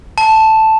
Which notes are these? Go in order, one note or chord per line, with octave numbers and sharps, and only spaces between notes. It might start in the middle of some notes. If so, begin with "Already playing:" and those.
A5